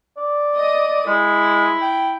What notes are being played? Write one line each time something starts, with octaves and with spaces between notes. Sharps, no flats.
D5
D#5 D#6
G#3 E4
G5